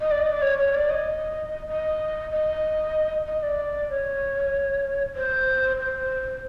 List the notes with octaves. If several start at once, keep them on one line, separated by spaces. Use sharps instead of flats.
D#5
D5
D#5
D5
C#5
C#5
D5
D#5
D#5
D#5
D#5
D5
C#5
C5
C5